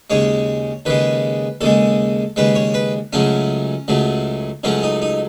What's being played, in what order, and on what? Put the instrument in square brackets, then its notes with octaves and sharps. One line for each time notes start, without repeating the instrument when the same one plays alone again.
[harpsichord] D#2 C#3 G#3 C#5
D#2 C#3 G#3 B4
D#2 C#3 G#3 A4
D#2 C#3 G#3 B4
C#5
B4
C#2 C#3 F#3 A3 C#4
C#2 C#3 F#3 A3
C#2 C#3 F#3 A3 C#4
D#4
D#4